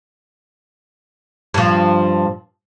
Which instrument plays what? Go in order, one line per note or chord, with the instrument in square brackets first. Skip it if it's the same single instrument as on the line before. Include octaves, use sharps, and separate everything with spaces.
[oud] G2 F3